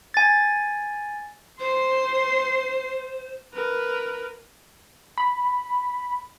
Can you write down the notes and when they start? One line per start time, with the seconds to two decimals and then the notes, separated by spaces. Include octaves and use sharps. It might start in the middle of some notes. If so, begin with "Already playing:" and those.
0.14 G#5 A6
1.60 C5 C6 C7
3.54 A#4 B4
5.18 B5